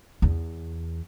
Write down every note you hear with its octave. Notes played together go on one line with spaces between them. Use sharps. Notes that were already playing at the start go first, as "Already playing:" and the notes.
E2